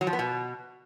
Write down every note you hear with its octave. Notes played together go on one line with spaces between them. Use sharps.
F#3
F3
B3
B2